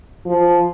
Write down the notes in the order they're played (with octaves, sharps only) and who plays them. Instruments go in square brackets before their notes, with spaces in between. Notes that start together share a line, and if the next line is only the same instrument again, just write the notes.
[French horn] F3